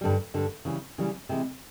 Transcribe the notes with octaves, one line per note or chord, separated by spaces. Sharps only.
G2 D3 G3
G2 D3 G3
C#3 E3 G3
C#3 E3 G3
C3 E3 G#3